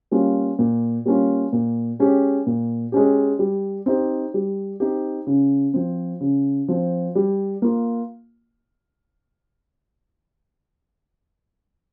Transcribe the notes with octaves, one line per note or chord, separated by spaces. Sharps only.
G3 A#3 C#4 F4
A#2
G3 A#3 C#4 F4
A#2
G#3 C#4 G4
A#2
G#3 C#4 G4
G3
C4 D#4 G4
G3
C4 D#4 G4
C#3
F3 C4
C#3
F3 C4
G3
A#3 F4